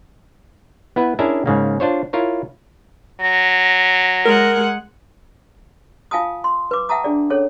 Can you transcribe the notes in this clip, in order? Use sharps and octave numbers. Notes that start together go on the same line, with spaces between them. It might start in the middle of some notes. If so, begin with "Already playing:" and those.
B3 E4 B4
C#4 D4 E4 G#4 A#4 E5
G#2 C#3 A#3
D4 F4 C5 C#5
E4 F4 A#4 C#5
F#3 A#6
G#3 A#4 F#5
F4 F5 G#5 A5 D#6
C6
B4 D6
E5 F#5 G5 A5 A#5 D#6
D4 G#4 D5
C#4 G#4 A4 C#5